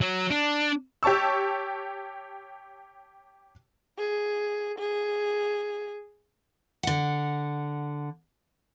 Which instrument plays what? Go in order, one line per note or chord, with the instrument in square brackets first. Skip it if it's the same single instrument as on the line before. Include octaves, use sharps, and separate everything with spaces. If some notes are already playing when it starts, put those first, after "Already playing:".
[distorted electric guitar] F#3
D4
[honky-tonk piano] G4 C#5 A5 C#6 E6
[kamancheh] G#4
G#4
[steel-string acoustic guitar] D3 F#5